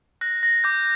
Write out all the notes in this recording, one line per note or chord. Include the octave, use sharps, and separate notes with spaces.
F#6 A#6
A#6
D6 G6